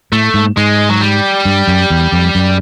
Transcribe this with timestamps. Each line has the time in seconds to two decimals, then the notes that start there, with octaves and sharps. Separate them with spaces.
0.12 A2 A3
0.34 G#2
0.57 G#2 G#3
0.89 F#3
1.01 G3
1.45 G2
1.68 F#2
1.90 E2
2.12 F2
2.35 F#2